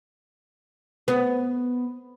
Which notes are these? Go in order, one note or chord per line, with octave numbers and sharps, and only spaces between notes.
B3